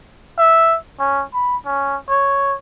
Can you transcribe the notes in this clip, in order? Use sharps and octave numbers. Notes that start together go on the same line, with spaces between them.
E5
C#4
B5
C#4
C#5